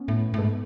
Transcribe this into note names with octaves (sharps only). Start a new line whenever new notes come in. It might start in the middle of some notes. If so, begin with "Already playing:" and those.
Already playing: B3 C#4
A2
A2
G#2 A3 B3